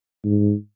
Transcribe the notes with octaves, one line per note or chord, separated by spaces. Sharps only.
G#2